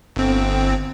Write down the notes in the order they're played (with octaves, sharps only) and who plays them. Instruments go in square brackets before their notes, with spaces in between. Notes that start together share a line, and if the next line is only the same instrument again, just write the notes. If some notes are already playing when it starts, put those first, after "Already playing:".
[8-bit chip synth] G1 C4